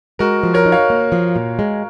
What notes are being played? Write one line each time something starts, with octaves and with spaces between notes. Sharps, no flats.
G#3 F#4 A#4
F3
A#4 C#5
D#4
C#5 F5
A#3
F3
A#2
G#3